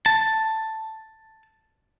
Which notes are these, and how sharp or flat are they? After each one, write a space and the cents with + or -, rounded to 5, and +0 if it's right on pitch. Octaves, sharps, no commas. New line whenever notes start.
A5 +5